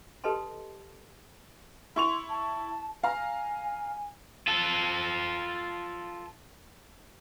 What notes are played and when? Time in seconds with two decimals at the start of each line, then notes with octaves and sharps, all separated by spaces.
0.24 G4 A4 B4 D#5 A5 C6
1.96 E4 C6 C#6 F7
2.30 A5
3.03 F5 G#5 A#5
4.47 F4 A4